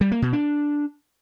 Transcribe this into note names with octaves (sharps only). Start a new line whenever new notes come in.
G3
A#3
B2
D4